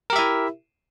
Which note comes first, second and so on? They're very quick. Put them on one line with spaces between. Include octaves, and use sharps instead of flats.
A#4 G4 E5 E4